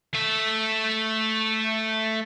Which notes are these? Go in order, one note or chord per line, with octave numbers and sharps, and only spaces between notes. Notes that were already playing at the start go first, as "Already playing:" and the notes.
A3 E5